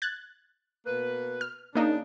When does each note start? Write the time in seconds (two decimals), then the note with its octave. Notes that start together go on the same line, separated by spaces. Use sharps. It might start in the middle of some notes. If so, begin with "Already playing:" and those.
0.02 F#6 G#6 A6
0.86 B2 A#3 B4
1.41 F6
1.75 C#3 A#3 D4 D#4